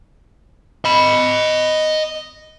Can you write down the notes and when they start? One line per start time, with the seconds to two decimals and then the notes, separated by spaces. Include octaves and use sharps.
0.85 D#5 B5